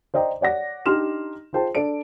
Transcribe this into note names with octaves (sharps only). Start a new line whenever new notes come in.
C5 D5 D#5 G5 A#5
C#5 D5 F#5 A#6
D4 D#4 G4 C6 F6 E7
F4 G#4 C5 G5 A5
D4 A4 D5 A5 D7